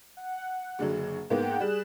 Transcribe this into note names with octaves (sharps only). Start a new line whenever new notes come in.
F#5
F#1 D3 F#3
G#2 A#3 B3 F#5 G5
G3 G#4 F#6 E7